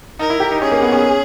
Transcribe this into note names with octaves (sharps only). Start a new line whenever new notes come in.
D#4 A#4
E4
G4
D#4
C#4 G#4
A#3
B3
C#4